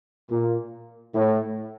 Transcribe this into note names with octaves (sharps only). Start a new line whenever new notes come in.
A#2
A2